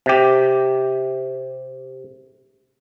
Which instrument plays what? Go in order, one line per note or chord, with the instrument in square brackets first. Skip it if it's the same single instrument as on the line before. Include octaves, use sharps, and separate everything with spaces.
[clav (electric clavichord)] C3 G4